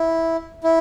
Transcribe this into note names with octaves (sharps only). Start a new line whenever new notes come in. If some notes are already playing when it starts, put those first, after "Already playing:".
Already playing: E4
E4